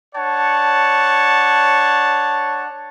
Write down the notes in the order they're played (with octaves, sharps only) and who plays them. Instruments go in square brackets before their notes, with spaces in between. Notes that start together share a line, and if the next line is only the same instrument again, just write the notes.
[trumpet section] D4 C#5 F#5 A5